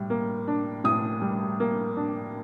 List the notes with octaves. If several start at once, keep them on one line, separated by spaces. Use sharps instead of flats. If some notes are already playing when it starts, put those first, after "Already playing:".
Already playing: A2 G3
A#3
D4
A2 D#6
G3
A#3
D4